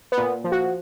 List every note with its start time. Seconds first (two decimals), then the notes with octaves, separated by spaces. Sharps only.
0.12 B3
0.18 A#2
0.44 F3
0.52 F#4